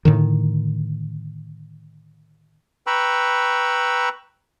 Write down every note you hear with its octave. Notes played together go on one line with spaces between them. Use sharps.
A2 D3 D#3
B4 G5 A#5 B5 C#6 E6